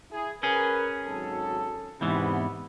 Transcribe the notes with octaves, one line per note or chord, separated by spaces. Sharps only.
E4 G#4
C#4 G#4 A#4 B4
G#1 F#3 A4
E2 G#2 C3 E3 B3